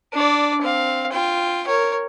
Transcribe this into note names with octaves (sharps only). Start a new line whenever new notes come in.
D4 D5
C4 F5
F4 G5
A#4 C#5